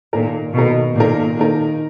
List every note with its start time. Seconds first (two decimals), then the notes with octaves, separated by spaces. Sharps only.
0.13 A#2 D#3 A#3 D#4 A#4
0.54 B2 D#3 A#3 D#4 A#4
0.95 A#2 D#3 A#3 D#4 A#4
1.37 D#3 A#3 D#4 A#4